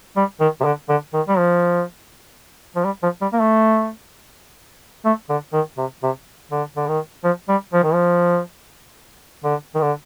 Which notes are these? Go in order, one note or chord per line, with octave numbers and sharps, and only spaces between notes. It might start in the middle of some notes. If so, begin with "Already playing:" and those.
G3
D#3
C3
D3
D3
D#3
G3
F3
F3
G3
F3
G3
A#3
A3
A3
D3
D#3
C3
C3
D3
D3
D#3
F3
G3
F3
D#3
F3
D3
D#3
D3